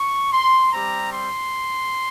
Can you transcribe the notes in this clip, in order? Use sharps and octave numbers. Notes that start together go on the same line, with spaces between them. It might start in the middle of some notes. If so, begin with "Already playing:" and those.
Already playing: C#6
C6
G3 C4 G4 A#5
C6